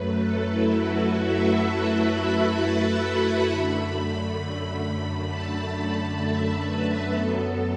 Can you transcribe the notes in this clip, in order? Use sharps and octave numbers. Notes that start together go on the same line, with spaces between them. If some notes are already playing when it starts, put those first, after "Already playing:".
Already playing: F#2 F#3 A3 B4
A4
E4
F#4
E5
F#5
B5
A5
B5
F#2 D3 A3
A5
A5
E5
B4
F#2 F#3 B3 A4